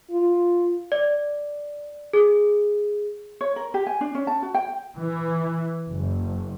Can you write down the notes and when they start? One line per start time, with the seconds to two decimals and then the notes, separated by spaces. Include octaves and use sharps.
0.11 F4
0.92 D5
2.13 G#4
3.41 C#5
3.56 A#4
3.74 G4
3.87 G#5
4.01 D4
4.15 C#4
4.27 A5
4.42 F#4
4.54 G5
4.99 E3
5.90 F#1